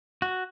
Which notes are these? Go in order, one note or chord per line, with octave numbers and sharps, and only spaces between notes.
F#4